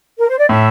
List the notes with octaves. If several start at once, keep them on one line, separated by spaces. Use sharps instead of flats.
A#4
C5
D5
A2 E5